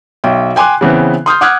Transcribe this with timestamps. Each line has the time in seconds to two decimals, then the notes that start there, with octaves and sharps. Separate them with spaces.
0.24 B1 E5 G5
0.56 G5 G#5 C6 D6 F#6
0.81 C#3 E3 B3 C4
1.26 C6 D#6 F6 G6
1.41 F#5 D6 D#6 F6 F#6 G#6